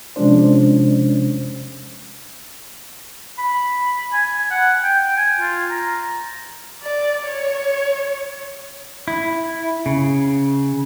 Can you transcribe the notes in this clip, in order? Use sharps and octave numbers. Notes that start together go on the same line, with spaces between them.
C3 F3 G#3 C#4 D4 C5
B5
G#5
F#5
G5
G#5
F4
A#5
D5
C#5
E4
C#3